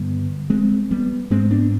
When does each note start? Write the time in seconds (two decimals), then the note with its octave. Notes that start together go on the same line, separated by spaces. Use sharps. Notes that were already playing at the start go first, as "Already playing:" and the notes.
Already playing: G2 D3 G3 B3
0.50 G#3 C4
0.91 G3 B3
1.30 G#2 G#3 C4
1.51 B3 D4